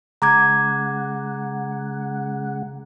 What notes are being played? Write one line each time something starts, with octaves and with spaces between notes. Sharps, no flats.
C#3 G#3 F#5 A#5 D6 G#6